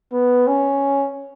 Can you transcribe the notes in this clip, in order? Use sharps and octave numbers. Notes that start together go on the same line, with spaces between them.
B3
C#4